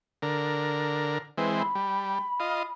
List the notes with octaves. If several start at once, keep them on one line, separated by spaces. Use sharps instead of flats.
D3 A#4
E3 G#3 C4 B4
B5
G3
F4 D#5